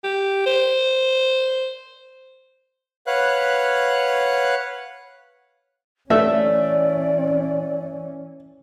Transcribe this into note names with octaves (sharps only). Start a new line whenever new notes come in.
G4
C5
B4 C#5 F5 F#5 F#6
E3 A3 C#4 D5 E5